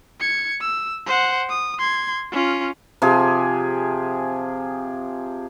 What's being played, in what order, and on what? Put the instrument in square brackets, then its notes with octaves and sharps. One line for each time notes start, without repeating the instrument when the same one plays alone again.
[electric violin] G#6 C#7
E6
C5 F#5
D#6
C6 G#6
C#4 F4
[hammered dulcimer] C3 F3 G4 G#4